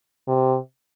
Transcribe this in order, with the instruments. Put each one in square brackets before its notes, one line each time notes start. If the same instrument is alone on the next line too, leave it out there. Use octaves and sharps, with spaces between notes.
[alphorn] C3